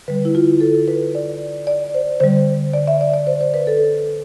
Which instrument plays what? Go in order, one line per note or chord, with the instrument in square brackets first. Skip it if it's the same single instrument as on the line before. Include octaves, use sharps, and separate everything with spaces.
[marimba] D3 G3 B4
E4
F4
A4
B4
D5
D5
C5
D3 G3 C5
D5
E5
D5
D5
C5
C5
B4
A4